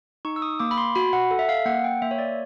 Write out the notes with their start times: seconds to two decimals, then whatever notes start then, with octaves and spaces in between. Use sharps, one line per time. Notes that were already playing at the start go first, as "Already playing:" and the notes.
0.25 D#4 C#6
0.36 E6
0.42 D#6
0.60 A#3 D6
0.71 B5
0.77 C6
0.95 F#4 B5
1.13 F#5
1.31 A4
1.39 E5
1.49 F5
1.66 A#3 F#5
1.84 G5
2.02 A#3 E5
2.11 C#5
2.18 D5